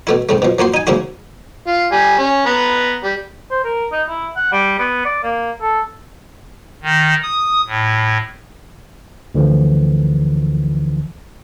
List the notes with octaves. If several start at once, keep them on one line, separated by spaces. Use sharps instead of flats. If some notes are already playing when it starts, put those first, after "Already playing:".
B2 A3 E4
G#2 C3 A3
B2 F3
F3 A#3 F#4 C5
D#4 G#5
G#2 C#3 A#3 E4 F#4
F4
G3 G#5
C#4
B3 B4 A#5
G3
C5
A#4
D#4
E4
F#5
G3
B3
D5
A#3
A4
D#3
D#6
A2
D2 D3 E3 F3